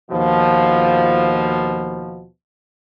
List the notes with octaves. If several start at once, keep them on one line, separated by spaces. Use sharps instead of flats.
D#2 B2 F3